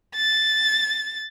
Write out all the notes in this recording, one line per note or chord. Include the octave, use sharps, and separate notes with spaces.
A6